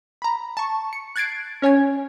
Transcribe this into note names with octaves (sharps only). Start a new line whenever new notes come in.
A#5 B5
A5 C#6
C#7
F#6 G#6 A6 C7 D7
C#4 C#5 G#5 G#6